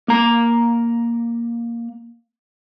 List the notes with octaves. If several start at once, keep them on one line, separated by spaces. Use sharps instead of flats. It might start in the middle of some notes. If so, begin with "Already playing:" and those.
A#3 A#5